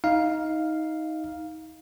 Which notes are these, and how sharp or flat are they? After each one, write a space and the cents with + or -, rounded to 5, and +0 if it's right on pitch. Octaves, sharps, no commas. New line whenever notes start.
D#4 +20 F5 +0